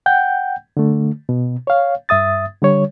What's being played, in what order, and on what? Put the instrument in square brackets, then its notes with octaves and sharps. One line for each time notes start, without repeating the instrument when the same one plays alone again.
[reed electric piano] F#5 G5 G6
D3 A3
B2
C#5 F5
G2 E5 D#6 A6
D3 G3 C#5